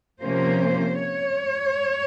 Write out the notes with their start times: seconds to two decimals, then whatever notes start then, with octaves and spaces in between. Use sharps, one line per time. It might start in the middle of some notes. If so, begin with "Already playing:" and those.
0.22 C3 F3 A#3 C#4 C5
1.00 C#5